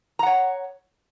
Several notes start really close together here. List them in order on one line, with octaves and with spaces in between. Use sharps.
A#5 F#5 C#5